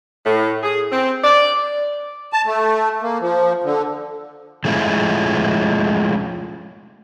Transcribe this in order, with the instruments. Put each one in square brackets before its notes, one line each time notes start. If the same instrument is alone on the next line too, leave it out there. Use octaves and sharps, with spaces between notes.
[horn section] A2
G#4
C4
D5
[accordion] A5
A3
A#3
F3
D3
[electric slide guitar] F3 G#3 A3 C#4 E4 F4